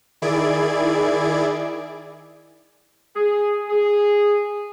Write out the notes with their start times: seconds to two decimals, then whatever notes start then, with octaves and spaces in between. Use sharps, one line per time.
0.22 D#3 E4 G#4 D5 G#6 D7
3.16 G#4
3.69 G#4